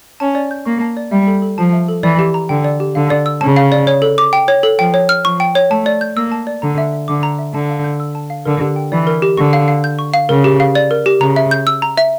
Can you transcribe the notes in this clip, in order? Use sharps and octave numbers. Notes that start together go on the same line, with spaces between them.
C#4 A5
D5
G6
A#3 C#6
A5
D5
G3 E5
A4
A4
F3 A5
E5
A4
E3 D5
G4
A#5
D3 G5
D5
G4
D3 F5
D5
E6
C#3 A5
F5
D5
C#5
A4
D6
G5
C#5
A4
F3 G5
C#5
F6
F3 C#6
G5
C#5
A3 A5
D5
G6
A#3 E6
A5
D5
D3 A#5
E5
E5
D3 D6
A#5
E5
D3 A5
F5
G6
E6
A5
F5
D3 A#4
G4
G5
E3 D5
A#4
G4
D3 C#6
F5
F5
G6
C#6
F5
C#3 A#4
G4
F5
D5
A#4
G4
C#3 A#5
E5
G6
E6
A#5
E5